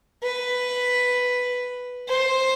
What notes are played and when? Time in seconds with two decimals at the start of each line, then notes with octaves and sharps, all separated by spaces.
0.23 B4
2.09 C5